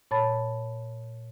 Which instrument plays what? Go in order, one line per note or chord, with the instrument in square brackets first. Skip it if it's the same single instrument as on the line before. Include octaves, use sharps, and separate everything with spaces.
[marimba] A#2 C#5 A5 B5 A6